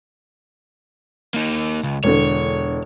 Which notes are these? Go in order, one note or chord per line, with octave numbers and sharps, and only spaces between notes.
A#3 D#4
C#2
E1 D3 C#5